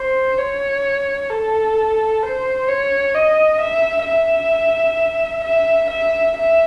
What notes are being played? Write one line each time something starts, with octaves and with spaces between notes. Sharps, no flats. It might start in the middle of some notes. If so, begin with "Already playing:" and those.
Already playing: C5
C#5
A4
C5
C#5
D#5
E5
E5
E5
E5
E5